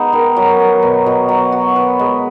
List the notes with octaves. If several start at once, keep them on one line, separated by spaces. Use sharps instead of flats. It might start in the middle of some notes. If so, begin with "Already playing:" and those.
Already playing: G#3 B3 D#4
D#3
F#3
B3
B2
B2
F#3
F#4
B4
G#3